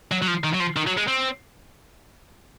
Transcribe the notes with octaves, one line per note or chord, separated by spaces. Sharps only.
F#3
F#3
F3
D#3
F#3
F3
D#3
F#3
G#3
C4